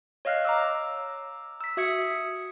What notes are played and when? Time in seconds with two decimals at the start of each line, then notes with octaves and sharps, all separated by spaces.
0.25 C#5 D#5 F5 F6 F#6 C7
0.45 A#5 D6 E6
1.61 E6 B6
1.77 F#4 E5 D#6 G#6 C#7